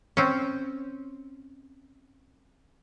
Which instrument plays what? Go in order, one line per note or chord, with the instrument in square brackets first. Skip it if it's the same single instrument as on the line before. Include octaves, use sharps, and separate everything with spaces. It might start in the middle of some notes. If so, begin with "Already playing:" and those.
[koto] C4 C#4